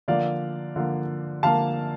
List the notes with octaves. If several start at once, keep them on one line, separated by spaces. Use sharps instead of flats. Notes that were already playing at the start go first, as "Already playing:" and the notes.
D3 F3 A#3 D5 F5
D3 F3 A#3
D3 F3 A#3 F5 A5